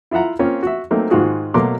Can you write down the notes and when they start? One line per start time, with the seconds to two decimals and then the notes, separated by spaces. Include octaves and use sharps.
0.11 E4 F4 E5 F#5 A#5
0.39 A#3 C4 C#4 F4
0.63 F#4 E5
0.91 F#3 A3 A#3 C4 D#4
1.10 G#2 D#3 F4 F#4 G#4
1.54 B2 F#3 A3 A#3 C6 D6